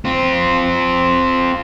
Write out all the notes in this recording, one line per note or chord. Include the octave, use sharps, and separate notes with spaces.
C4 F4